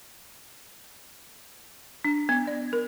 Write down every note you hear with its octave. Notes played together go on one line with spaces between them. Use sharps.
D4
B3
D5
A#4